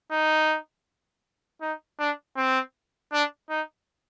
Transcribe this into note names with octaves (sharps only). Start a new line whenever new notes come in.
D#4
D#4
D4
C4
D4
D#4